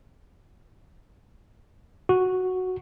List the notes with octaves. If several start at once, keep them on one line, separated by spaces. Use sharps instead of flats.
F#4